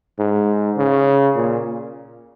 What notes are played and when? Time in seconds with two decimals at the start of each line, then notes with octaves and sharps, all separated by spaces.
0.19 G#2
0.77 C#3
1.35 A#2